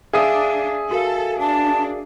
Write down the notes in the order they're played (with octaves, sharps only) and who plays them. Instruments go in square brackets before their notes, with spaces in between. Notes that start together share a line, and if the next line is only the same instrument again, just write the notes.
[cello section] D4 [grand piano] G#4 E5 D#6 [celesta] F5
[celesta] F#4 A#4 F5 [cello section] A4
[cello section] D4 [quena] A5